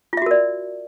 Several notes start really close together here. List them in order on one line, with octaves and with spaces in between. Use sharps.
F4 E5 F#4 A#4 D5